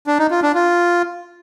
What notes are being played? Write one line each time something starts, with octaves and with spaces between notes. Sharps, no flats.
D4
D#4
F4
D4
F4